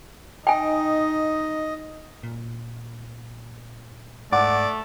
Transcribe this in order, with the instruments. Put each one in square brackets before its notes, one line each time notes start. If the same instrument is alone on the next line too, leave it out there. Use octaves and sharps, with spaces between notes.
[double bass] D#4 [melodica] D#5 [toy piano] G5 G#5
[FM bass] A#2
[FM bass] G#2 [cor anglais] A3 [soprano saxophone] D5 [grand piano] F#5 D6